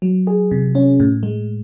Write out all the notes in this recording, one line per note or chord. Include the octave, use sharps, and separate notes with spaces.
F#3
G#4
C3
C#4
A2
G#3